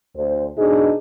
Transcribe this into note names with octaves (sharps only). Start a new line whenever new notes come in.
D2 C5
B2 D4 D#4 G#4